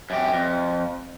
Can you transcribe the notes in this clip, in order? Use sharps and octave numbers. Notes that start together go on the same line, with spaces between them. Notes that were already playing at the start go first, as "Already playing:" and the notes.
F#2 G4
F2